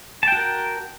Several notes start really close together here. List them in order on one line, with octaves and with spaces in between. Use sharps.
A5 G5 F#4 A#4